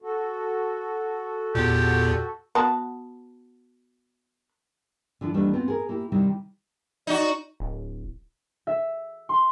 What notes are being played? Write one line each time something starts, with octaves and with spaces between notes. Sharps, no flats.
F#4 A4
E2 A#2 G4
B3 F#4 A5
D3 F3 E4
D#2 E3 G3 A3 D4 B4
B3 C4 F4
G#4 A#4
A#3 E4 G4
C3 D#3 G3 C4 D#4 E4
D#4 F#4 D5
D1
E5
C6